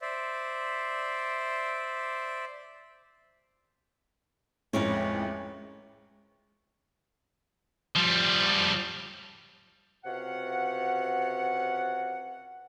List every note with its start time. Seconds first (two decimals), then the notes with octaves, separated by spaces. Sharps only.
0.02 C5 D5 E5
4.73 A1 F2 A2 G#3 C#4 A#4 B4
7.96 F3 G3
10.04 C#2 C3 F#4 F5 F#5